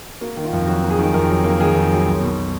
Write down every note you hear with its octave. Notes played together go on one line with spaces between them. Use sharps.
A#3 F#4
D#3
F4
F2
F#3 F#4
A#3
G#4
D#3
F2 A#4
F#3
A#3
D#3 G#4
F2
F#3
B1
B2